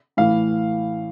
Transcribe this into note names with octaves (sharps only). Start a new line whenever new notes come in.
A2 E3 F5